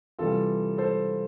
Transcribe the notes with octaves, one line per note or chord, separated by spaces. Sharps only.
C3 E3 G3 F4 A4
A4 C5